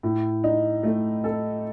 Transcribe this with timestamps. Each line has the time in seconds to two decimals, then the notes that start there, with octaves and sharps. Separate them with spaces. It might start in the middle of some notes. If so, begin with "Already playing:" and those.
0.03 A2
0.44 D#4
0.83 A3
1.24 A4